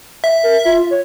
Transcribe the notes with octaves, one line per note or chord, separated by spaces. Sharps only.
E5
A#4
F4
C#5